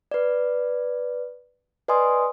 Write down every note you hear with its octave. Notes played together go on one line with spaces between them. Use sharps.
B4 D5
B4 D5 D#5 G#5 C6 D#6